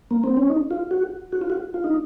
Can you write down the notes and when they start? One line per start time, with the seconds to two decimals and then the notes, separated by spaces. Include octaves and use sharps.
0.11 A#3
0.24 C4
0.37 C#4
0.50 D#4
0.71 F4
0.91 F#4
1.32 F#4
1.41 F4
1.50 F#4
1.74 F4
1.84 D#4